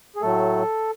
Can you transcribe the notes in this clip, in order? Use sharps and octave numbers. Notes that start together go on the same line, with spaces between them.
G#4
A2 F#3 A3 A4